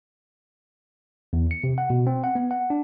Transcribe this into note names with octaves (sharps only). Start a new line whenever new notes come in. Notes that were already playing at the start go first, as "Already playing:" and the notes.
E2
C#7
C3
F#5
B2
C4
F#5
B3
F#5
D4